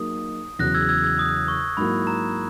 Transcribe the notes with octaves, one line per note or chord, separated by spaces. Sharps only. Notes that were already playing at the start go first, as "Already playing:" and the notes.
Already playing: F#3 A#3 D#4 G#4 D#6
E2 C#3 F#3 F#6 A#6
E6 G#6
E6 G#6
E6 G#6
D#6
C#6
G#2 F#3 A#3 E4 B5
A#5